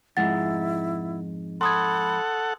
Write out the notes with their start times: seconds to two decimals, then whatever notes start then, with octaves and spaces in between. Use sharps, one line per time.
0.17 F2 G#2 G#3 E4 F#5 A6
1.61 A4 F#5 B5 C6 D#6 G#6